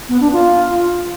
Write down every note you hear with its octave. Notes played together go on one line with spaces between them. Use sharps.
B3
D4
F4